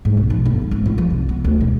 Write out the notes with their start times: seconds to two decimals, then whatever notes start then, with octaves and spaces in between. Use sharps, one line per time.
0.05 G#2
0.17 B1
0.30 F3
0.45 G1
0.71 G#1
0.86 F4
0.98 F3
1.10 C2
1.29 B3
1.44 D2
1.60 E1